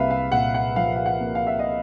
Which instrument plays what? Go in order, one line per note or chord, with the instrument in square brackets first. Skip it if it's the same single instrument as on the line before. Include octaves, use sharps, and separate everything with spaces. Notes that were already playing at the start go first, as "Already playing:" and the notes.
Already playing: [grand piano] C2 A#3 B4 E5 F5
F5
A#2 F#5
F#5
F3 F5
F5
F#5
A#3
F5
E5
D#5